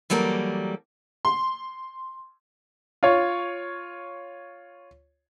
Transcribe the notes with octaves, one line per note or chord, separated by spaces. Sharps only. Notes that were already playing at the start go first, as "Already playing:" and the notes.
E3 F#3 G3 A#3 A4
C6
F4 C#5